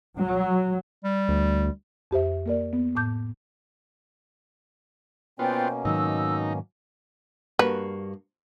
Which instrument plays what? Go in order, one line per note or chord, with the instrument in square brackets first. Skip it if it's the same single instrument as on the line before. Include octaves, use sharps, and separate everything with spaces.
[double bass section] F#3
[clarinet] G3
[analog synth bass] D2
[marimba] F2 G4 C5 E5
A#3 A#4 D5
B3
A2 A5 D6 G6
[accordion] B2 A#3 C#4 [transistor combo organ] B3 F4 [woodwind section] C5 D5 G5
[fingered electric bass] G#2 D#3 F#3 [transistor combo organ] D#4 [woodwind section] E6
[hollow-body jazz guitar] G2 A#3 F#4 [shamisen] B4